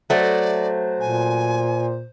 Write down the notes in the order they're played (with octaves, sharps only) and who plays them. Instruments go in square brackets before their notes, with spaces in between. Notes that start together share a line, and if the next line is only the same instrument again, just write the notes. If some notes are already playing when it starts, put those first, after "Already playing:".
[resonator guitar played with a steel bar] F#3 A3 [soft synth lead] C5 [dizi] D5
[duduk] A#2 [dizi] G#5